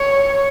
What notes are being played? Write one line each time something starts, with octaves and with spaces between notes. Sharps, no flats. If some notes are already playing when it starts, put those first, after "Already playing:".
Already playing: C#5